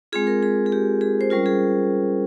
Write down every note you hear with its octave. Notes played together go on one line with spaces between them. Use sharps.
G#3 C4 F4 G#4
A#4
G#4
G#4
G4
G#4
C5
G3 C#4 F4 A#4
G#4